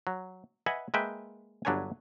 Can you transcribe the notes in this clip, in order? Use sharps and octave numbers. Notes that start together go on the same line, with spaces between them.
F#3
B4 D#5 E5 F#5 G#5
G#3 A#3 B4 E5 G5
G1 F#3 D4 B4 C#5 G#5